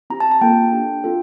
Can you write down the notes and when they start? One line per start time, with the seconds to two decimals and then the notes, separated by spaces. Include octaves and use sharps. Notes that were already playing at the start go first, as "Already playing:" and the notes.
0.10 C4 E4 G4 A#5
0.20 A5
0.31 A5
0.41 A#3 F4 A4 G5
0.73 D4 G4
1.04 C4 F4 A4